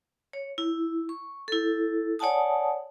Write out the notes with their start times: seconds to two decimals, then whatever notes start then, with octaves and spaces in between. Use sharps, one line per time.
0.33 C#5
0.58 E4
1.09 C#6
1.48 E4 A4
2.19 C#5 D5 F#5 G#5 A5 D#6